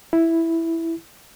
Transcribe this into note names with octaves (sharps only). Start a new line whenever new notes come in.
E4